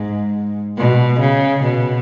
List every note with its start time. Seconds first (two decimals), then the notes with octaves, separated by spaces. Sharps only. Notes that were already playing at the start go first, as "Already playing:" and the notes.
Already playing: G#2
0.77 B2
1.20 C#3
1.63 B2